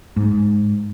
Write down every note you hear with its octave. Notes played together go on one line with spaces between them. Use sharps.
G#2